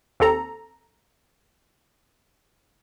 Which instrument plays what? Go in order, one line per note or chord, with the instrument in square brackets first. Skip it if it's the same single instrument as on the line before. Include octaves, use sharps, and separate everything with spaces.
[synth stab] D#2 C4 A4 A#5